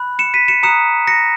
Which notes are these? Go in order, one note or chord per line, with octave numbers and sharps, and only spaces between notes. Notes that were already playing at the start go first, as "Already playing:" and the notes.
Already playing: B5 F#6
C#7 E7
B6 D#7
C#7 E7
A#5 D#6 F#6 C#7 E7
A#6 C#7